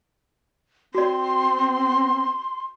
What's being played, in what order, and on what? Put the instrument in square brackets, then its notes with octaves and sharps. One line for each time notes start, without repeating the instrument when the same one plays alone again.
[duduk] C4 [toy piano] F#4 D5 [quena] C6